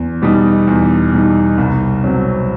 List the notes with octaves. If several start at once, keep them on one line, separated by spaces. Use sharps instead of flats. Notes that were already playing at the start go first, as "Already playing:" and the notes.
Already playing: E2
B2 G3 D#4
E2
B2 G3 D#4
C2
B2 F#3 C4